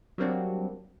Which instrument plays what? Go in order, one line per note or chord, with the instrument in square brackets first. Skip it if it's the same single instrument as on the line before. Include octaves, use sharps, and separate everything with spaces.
[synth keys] F#3 G3 A#3 C4 D4 F#4